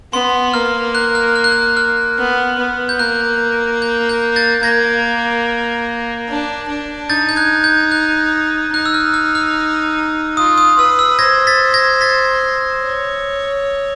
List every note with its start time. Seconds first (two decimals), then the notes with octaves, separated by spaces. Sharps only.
0.13 B3 C6
0.54 A#3 F6
0.95 F#6
1.15 F6
1.36 F6
1.44 F#6
1.52 F6
1.77 F6
2.18 B3
2.59 B3
2.89 G6
2.99 A#3 F#6
3.82 G6
4.09 G6
4.36 G6 A6
4.63 A#3 G#6 A#6
6.28 D4
6.68 D4
7.09 D#4 G6 A6
7.29 G6
7.36 F#6 G#6
7.64 G6
7.92 F#6
8.74 D#4 F#6
8.86 E6
8.94 F6
9.14 F6
9.35 F6
10.37 F4 D#6
10.58 D#6
10.78 B4 E6
10.99 E6
11.19 C5 G#6 A#6
11.47 A6 B6
11.74 G#6 A#6
12.01 A6 B6
12.83 C#5